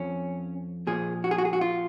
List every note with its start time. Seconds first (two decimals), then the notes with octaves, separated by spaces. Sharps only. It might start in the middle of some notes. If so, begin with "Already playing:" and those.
Already playing: F2 F3 C#4
0.87 A#2 F3 G#4
1.24 F#4
1.31 G#4
1.38 F#4
1.45 G#4
1.53 F#4
1.61 F4